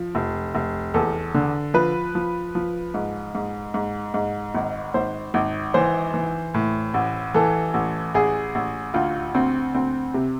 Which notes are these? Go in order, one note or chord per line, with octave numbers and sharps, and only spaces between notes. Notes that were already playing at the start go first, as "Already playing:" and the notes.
Already playing: F3
F1
F1
E2 A4
D3
F3 B4
F3
F3
G#2
G#2
G#2
G#2
G#1
G#1 C5
G#1
E3 C5
E3
A2
A1
E3 A4
A1
A1 G#4
A1
D2 F4
D2 C4
D2 C4
C3